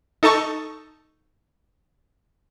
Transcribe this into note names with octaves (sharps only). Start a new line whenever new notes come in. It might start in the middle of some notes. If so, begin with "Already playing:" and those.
D#4 A4 D#5 A5 C#6 D#6